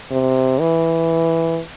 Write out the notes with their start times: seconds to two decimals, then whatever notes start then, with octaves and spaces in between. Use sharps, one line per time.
0.11 C3
0.60 E3